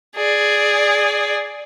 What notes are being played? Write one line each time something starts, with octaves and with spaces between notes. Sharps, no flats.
G#4 D5